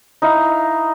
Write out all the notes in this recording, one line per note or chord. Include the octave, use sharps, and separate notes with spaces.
D#4 E4 F5